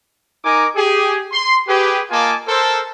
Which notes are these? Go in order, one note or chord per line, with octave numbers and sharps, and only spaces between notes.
D#4 A#4 D#5 G#5 D6
G4 G#4
C6
G4 G#4 B4
A#3 F4 D#5 G#5 A5 D6
A4 A#4 C5